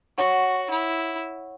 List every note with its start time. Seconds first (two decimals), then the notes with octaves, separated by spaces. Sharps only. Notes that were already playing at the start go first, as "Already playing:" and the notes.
0.18 F#4 C#5 F#5 C#6
0.70 E4